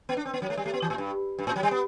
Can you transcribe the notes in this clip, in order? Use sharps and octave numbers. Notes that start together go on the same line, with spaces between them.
B3
D4
C4
B3
F#3
A3
G3
A3
B3
E3
A2
G2
G2
A2
F#3
G3
B3